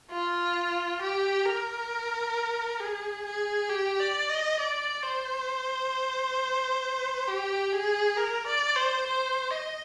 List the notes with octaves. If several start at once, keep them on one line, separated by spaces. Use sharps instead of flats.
F4
G4
A#4
G#4
G#4
G4
D5
D#5
D5
C5
G4
G#4
A#4
D5
C5
C5
D#5